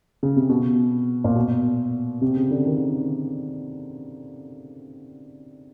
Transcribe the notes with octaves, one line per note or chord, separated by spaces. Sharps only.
C#3
C3
B2
A#2
B2
C3
C#3
D3
D#3